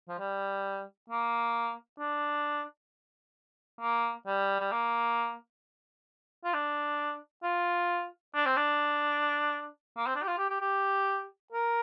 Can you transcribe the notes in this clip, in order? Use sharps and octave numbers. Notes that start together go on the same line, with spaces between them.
F3
G3
A#3
D4
A#3
G3
G3
A#3
F4
D4
F4
D4
C4
D4
A#3
C4
D4
G4
F4
G4
G4
G4
A#4